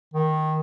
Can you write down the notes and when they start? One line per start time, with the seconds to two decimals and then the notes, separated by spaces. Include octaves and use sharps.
0.14 D#3